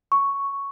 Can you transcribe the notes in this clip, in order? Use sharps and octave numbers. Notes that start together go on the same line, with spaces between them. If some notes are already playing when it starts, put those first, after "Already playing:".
C#6